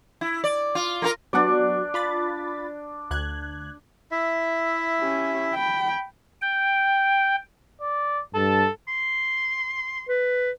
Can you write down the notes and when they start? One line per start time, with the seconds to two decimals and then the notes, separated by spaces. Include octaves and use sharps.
0.21 E4
0.44 D5
0.75 F4
1.02 A#3 F4 A#4
1.33 F#3 B3 D4 F#4 D5
1.94 F4 B5 A6
3.11 D2 F#6 G#6
4.11 E4 E5
4.99 C#4 G4
5.54 G5 B5
6.42 G5
7.81 D5
8.35 G2 A4 A5
8.88 C6
10.09 B4